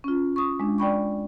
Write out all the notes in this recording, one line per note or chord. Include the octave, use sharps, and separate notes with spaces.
C#4 F4
C#6 D#6
G#3 D4
D5 G5 B5 C#6